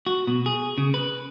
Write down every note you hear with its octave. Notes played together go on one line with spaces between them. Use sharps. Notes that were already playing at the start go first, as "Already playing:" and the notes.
F#4
B2
G#4
C#3
B4